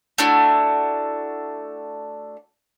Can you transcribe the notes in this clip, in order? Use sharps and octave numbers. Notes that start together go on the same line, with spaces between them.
A3 D4 E4 F#4